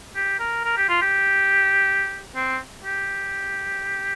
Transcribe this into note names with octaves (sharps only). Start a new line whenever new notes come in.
G4
A#4
A#4
G4
F4
G4
C4
G4